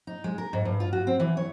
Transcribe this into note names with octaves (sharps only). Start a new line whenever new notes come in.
D#4
G#3
A#4
G#2
G2
F4
F#4
C4
E3
C#5